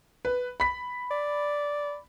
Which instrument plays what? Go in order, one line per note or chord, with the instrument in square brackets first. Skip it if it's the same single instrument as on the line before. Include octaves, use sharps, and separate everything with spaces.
[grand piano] B4
B5 B6
[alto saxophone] D5